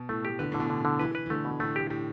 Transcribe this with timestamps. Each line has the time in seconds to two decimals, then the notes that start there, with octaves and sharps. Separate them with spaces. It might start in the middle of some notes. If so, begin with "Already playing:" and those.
Already playing: B2
0.09 A2 A3
0.25 G4
0.39 D3 B4
0.52 A2
0.54 D3
0.60 B2
0.70 D3
0.85 D3
0.99 E3 B4
1.15 B4
1.26 E3
1.30 D3 A3
1.45 B2
1.60 A2 A3
1.76 G4
1.90 A2 G4